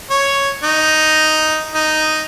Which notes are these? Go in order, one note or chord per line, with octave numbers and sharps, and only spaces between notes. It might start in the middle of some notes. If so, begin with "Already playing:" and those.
C#5
D#4
D#4